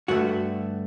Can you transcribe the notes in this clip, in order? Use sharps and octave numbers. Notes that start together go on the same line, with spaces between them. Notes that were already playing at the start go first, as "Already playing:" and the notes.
G2 D3 A3 F#4